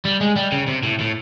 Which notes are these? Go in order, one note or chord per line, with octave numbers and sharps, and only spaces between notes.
G3
G#3
G3
C#3
C3
A2
A2